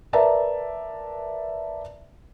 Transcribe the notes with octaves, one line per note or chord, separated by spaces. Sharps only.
A#4 B4 D5 E5 A5 A#5